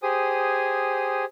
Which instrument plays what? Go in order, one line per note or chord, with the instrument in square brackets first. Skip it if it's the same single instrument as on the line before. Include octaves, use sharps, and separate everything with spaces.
[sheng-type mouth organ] G4 G#4 C5 G#5 D#6